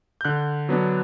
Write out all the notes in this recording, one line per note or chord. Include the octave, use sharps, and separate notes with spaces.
G6
D3 F#6
F#3 B3 D4